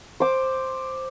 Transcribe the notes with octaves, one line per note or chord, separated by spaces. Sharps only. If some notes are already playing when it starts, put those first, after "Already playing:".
C5 D6